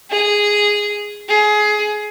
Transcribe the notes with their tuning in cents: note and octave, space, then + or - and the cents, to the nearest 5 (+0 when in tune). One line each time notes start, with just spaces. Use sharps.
G#4 -5
G#4 +20